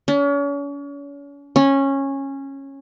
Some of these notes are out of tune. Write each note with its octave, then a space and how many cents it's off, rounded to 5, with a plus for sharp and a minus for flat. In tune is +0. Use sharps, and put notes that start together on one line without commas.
C#4 +40
C#4 -15